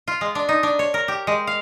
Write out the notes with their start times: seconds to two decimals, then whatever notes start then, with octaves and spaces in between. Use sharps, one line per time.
0.08 F4
0.21 G#3
0.35 D4
0.49 D#4
0.63 D4
0.79 C#5
0.94 A#4
1.08 G4
1.27 G#3
1.47 F5